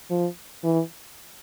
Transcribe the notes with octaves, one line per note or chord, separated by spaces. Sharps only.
F3
E3